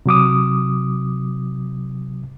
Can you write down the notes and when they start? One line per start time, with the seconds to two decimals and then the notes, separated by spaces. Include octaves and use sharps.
0.06 C3 F#3 D6 D#6